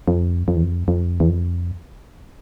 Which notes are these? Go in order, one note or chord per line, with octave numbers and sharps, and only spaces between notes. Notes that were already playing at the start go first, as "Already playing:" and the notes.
F2
F2
E2
F2
F2
E2
F2